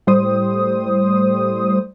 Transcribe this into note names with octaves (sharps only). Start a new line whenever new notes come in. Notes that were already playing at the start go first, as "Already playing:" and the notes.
A2 G3 C5 D#6